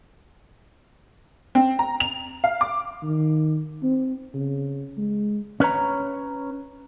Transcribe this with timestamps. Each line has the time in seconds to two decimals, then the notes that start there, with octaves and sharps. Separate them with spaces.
1.55 C4
1.79 A#5
2.00 F7
2.44 F5
2.61 D6
3.03 D#3
3.83 C4
4.34 C#3
4.98 G#3
5.60 C#4 B4 C#5 A#5